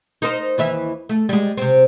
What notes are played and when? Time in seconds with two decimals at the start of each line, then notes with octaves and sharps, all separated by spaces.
0.22 D#4 A#4 C5
0.58 D#2 E3 E5
1.09 A3
1.29 G3 G#3
1.57 C3 C4